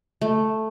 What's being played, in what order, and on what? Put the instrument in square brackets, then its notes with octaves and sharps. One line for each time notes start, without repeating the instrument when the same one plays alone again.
[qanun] A3